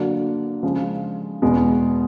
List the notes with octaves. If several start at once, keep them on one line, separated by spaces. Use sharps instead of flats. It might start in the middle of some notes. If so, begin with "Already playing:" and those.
Already playing: D3 F#3 A#3 D4
C#3 F3 G#3
E2 B2 G#3 B3